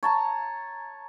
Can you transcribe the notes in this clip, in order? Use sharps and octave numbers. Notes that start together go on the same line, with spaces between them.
C#5 A5 A#5